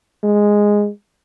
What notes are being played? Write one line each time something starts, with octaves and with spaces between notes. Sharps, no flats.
G#3